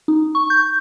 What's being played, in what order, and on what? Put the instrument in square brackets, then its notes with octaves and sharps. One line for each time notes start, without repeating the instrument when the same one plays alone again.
[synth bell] D#4
C#6
G6